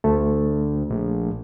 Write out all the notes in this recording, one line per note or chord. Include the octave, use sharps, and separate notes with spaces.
D2 A3
A#1